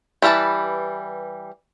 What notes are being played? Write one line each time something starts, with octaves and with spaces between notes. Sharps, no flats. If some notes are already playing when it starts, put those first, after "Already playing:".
E3 G3 A3 B4 A5